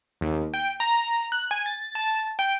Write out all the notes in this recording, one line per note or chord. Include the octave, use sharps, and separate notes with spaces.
D#2
G5
A#5
F#6
G#5
A6
A5
G5